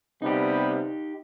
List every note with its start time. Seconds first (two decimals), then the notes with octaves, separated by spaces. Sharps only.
0.22 C3 G3 B3 D#4 G4